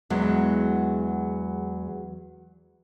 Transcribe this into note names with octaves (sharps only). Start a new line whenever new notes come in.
E2 F#3 G#3